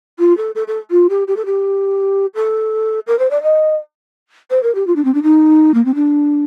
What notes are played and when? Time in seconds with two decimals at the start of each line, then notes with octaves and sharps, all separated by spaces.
0.19 F4
0.37 A4
0.55 A4
0.68 A4
0.91 F4
1.09 G4
1.28 G4
1.36 A4
1.46 G4
2.35 A4
3.07 A#4
3.19 C5
3.31 D5
3.43 D#5
4.50 C5
4.63 A#4
4.75 G4
4.87 F4
4.96 D4
5.05 C4
5.14 D4
5.23 D#4
5.74 A#3
5.85 C4
5.95 D4